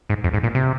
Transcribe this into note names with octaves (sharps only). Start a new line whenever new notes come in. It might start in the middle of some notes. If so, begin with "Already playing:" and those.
G#2
F2
G#2
A#2
C3